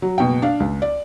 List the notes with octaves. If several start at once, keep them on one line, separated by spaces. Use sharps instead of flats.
F#3
F#1 B2 G5
D4 F5
C#2
D5